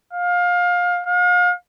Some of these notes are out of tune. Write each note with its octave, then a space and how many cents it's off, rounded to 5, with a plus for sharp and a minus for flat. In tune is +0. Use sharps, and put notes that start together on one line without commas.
F5 +25
F5 +40